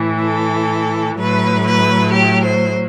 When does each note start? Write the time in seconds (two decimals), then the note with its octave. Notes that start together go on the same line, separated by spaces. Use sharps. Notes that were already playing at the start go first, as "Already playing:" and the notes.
Already playing: A2 E3
0.24 A4
1.19 A2 F#3 B4
1.66 B4
2.13 G4
2.44 C5